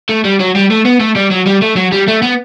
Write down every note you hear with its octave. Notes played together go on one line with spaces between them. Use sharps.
A3
G3
F#3
G3
A3
B3
A3
G3
F#3
G3
A3
F#3
G3
A3
B3